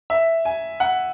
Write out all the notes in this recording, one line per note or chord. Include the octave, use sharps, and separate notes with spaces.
E5
G#5
F#5